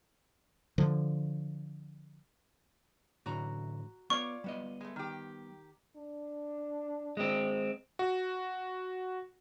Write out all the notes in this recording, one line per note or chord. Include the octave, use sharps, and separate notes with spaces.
D3 F3
A2 D3 E3 F#4 A#5
B3 F4 C#5 D5 C#6
G3 B3 D#5
G#3 A3
D#3 G4
D4
G#3 C4
F#4